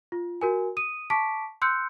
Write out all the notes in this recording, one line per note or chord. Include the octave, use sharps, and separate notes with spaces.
F4
F#4 A#4 G#5
D#6 D#7
A5 C#6 D6 B6 D7
C6 E6 F#6 G6 C#7